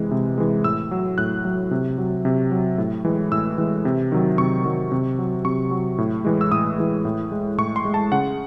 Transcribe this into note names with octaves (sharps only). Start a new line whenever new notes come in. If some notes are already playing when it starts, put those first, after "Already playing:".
Already playing: C3 E3 G#3
C3
E3 G#3
A2 E6
F#3
A2 F#6
F#3
C3
F#3
C3
F#3
A2
E3 G#3
A2 E6
E3 G#3
C3
D#3 F#3
C3 C#6
D#3 F#3
C3
F#3
C3 C#6
F#3
A2
E3 G#3
E6
A2 D#6
E3 G#3
A2
G#3
A2 C#6
C6
G#3
A5
C#3 F#5